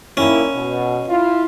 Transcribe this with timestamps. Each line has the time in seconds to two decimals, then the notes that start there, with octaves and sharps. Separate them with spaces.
0.17 A#2 D#3 C#4 E4
0.55 B2
1.09 E4 F4